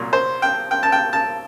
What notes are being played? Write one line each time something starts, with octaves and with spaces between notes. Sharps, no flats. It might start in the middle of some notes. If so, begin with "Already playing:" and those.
Already playing: C2 A#2 F#3
C5
G5
G5
A5
G5
A5